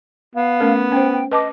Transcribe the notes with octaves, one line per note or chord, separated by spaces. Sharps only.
B3 F5
A3 C#4 A#4
C#4 C5 G5
G5
B4 D#5 A5 D6